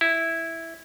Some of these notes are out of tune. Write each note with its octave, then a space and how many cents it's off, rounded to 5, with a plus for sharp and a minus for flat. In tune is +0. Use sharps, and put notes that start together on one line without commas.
E4 -5